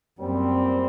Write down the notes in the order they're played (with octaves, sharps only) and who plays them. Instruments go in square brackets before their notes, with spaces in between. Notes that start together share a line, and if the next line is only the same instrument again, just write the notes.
[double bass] F#2 [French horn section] A#2 G3 C4